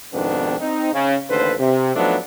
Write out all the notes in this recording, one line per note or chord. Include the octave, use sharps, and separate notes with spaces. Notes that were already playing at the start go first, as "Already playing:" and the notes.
F2 G#2 B2 D#3 B3 D4
C4 D#4
C#3
A1 D#2 D3 A4 B4 C5
C3
F3 F#3 A3 B3 D4 D#4